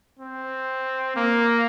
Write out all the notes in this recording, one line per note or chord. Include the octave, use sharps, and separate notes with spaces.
C4
A#3